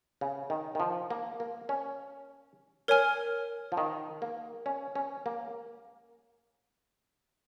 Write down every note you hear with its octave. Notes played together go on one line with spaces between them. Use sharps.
C#3
D#3
D#3
F3
A#3
A#3
C#4
A#4 C#5 G#5 F6
F3
D#3
A#3
C#4
C#4
A#3